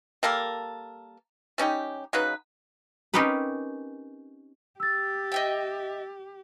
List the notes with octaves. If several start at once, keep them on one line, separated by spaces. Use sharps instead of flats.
G3 A#3 A4 A#4
G3 C#4 D#4 G4
C#3 F#3 D#4 B4
C4 C#4 D#4 G4 A#4 B4
G4 E6 A6
D#5 E5 G5